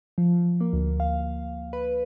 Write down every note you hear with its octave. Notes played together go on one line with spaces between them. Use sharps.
F3
A#3
D2
F5
B4